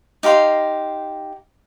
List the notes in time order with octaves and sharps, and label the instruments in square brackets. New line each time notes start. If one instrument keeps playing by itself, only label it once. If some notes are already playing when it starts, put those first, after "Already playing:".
[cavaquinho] D#4 G4 F5 C6